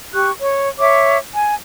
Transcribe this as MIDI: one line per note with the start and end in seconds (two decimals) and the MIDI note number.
0.14 0.31 67
0.14 0.31 85
0.14 0.31 90
0.41 0.68 73
0.79 1.17 73
0.79 1.17 76
0.79 1.17 86
1.34 1.55 80